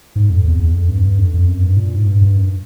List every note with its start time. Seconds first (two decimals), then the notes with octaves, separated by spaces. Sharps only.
0.16 G#2
0.30 F2
0.45 E2
0.59 E2
0.74 F2
0.88 G2
1.03 G2
1.18 F2
1.34 F2
1.48 F#2
1.63 G2
1.77 A#2
1.95 G#2
2.06 G2
2.22 G2
2.36 F#2